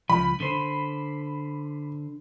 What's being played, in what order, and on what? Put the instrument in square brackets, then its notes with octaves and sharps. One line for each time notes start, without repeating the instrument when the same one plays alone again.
[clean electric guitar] C#2 F3 [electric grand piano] B5
[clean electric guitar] D3 C5